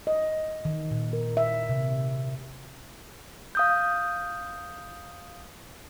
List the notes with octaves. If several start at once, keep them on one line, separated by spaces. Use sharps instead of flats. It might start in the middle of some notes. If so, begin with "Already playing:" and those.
D#5
D#3
A#2
A#4
E5
C3
F5 D#6 G6